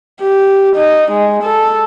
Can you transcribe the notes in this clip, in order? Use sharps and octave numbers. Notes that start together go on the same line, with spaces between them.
G4
D#4
G#3
A4